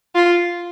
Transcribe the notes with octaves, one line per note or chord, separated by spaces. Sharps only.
F4